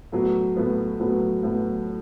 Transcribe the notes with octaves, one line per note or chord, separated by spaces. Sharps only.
A2 F#3 B3
A2 F#3 B3
A2 F#3 B3
A2 F#3 B3